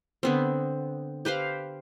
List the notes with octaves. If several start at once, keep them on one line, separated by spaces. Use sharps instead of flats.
D3 B3 C4
G4 B4 C5 F5